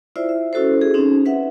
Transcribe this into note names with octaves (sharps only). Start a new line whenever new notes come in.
E4 F4 C5 D5 E5
E5
C#4 E4 F#4 A4 C5
G#4
C4 C#4 D#4
B4 E5 F#5